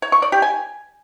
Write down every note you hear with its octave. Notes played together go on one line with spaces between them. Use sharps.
C#5
C#6
D5
G4
G#5